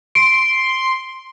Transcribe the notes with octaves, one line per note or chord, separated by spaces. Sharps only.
C6 D7